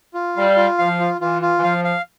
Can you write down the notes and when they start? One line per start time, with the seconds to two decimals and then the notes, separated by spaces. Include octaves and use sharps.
0.14 F4
0.36 G3 F5
0.57 F4
0.78 F3 F5
1.00 F4
1.20 E3 F4
1.42 F4
1.57 E3
1.63 F3 F5
1.85 F5